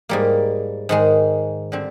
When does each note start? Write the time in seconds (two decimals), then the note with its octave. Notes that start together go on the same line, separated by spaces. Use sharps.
0.09 G#2 G3 A#3
0.89 G#2 D#3 G#3
1.72 D3 G3 C4